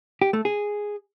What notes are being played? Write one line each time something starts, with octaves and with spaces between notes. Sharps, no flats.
G4
A3
G#4